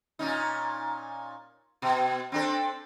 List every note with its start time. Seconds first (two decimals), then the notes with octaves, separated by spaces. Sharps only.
0.19 A#2 C#4 D#4
1.82 B2
2.32 C4 D4 A4